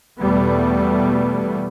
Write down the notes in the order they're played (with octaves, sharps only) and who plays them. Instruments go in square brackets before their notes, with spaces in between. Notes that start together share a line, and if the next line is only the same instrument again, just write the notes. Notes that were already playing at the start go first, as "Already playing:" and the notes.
[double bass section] E2 B2 G3 A3 B3